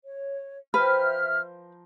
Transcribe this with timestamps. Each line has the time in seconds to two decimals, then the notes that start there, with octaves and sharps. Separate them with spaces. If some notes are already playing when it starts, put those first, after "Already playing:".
0.05 C#5
0.74 F3 B4 E5 G5 A#5 F6